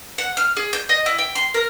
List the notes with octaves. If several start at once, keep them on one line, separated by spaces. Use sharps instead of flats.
F#5
F6
G#4
G6
D#5
E4
G5
C6
A#4